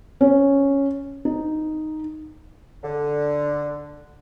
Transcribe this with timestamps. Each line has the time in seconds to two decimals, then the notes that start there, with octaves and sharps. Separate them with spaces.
0.21 C#4
1.25 D#4
2.83 D3